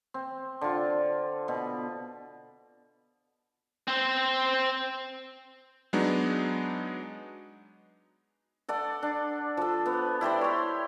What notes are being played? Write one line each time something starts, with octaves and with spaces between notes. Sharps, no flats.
C4
D3 F4
B2
C4 C5
F#3 G#3 B3 D4 D#4
A4 D5 F#5
D4
F3 A4
B3
E4 G4 C5 D5
C#5 C6